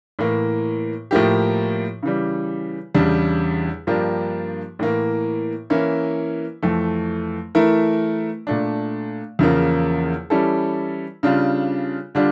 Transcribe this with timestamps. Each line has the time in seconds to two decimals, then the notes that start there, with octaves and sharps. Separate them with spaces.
0.19 A2 E3 A#3
1.11 A2 F3 A#3 E4 G4
2.03 C#3 E3 G3
2.94 E2 C#3 G3 D4
3.87 G2 F3 A#3 D4 G4
4.79 A2 E3 A#3
5.70 E3 A#3 C#4 E4
6.63 F2 E3 A3
7.55 E3 A3 E4 A#4
8.47 A#2 A3 D4
9.39 E2 C#3 F3 A#3
10.30 E3 G3 C#4 E4 A4
11.23 C#3 G3 D4 F4
12.15 D3 G3 D4 F4